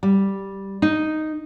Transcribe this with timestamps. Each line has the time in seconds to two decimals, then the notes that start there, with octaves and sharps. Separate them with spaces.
0.03 G3
0.82 D#4